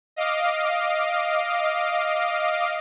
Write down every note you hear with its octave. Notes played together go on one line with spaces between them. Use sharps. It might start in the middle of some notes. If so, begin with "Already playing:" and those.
D#5 F5 D6